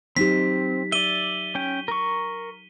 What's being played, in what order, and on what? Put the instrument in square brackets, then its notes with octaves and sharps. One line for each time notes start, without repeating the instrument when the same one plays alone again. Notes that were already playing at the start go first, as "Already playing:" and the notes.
[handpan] F#3 D#4 G4 [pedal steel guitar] C4 [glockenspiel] B6
[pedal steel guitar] D5 E5 [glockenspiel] D#7 G7
[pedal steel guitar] C#4 G5
A#4 C#6